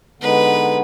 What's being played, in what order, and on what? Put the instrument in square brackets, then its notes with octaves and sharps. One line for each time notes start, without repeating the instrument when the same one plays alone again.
[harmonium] D3 G#3 B3 D#4 [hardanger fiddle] B4